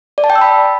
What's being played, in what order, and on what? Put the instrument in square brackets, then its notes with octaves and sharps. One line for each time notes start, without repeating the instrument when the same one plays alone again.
[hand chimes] D5
A5
G5
E6
B5